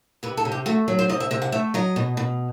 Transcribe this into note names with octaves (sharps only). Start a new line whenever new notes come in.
C3 B4
A4
C3
G4
A3 F#4
F#3
C5
C3 D#5
E5
C3 E5
F#5
A3 E5
F#3 D#5
B2
B2